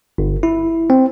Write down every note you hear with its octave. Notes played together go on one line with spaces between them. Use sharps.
G1
E4
C4